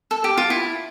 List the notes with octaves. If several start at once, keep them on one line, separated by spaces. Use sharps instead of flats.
A4
G4
F4
E4